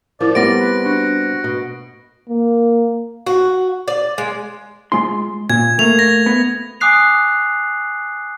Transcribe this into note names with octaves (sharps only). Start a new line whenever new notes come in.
F3 E4 A#4 D5
C3 G3 B3 A#6 D7
B4
D4 F#4
B2
A#3
F#4
D5
G#3
G#3 F4 C6
A#2 G#6
A3 A#3 F7
A#6
B3
G#5 D6 D#6 F#6 C7 F7